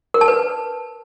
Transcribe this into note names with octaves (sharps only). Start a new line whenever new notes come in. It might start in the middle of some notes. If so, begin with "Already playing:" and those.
A#4
A5
B4